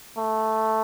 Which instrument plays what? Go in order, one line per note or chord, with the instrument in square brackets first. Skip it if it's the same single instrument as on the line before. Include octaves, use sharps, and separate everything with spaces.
[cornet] A3